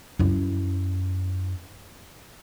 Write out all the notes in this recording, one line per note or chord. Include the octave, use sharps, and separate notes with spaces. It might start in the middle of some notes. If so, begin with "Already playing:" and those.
F#2 E4